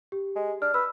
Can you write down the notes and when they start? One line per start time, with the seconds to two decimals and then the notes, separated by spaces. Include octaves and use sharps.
0.12 G4
0.36 G#3
0.62 D4 F6
0.74 B4 E6